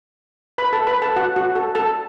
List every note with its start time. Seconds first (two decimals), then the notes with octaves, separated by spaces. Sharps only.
0.58 B4 B5
0.73 A4 A5
0.87 B4 B5
1.02 A4 A5
1.16 F#4 F#5
1.36 F#4 F#5
1.55 A4 A5
1.75 A4 A5